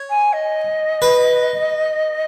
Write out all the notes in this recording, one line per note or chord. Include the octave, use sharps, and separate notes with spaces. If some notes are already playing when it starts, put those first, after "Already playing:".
Already playing: C#5
G#5
D#5
B4